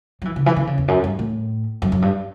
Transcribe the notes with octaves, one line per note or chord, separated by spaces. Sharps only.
F#3
E3
C#3
E3
D3
C#3
E2
F#2
G2
A2
F#2
F#2
G2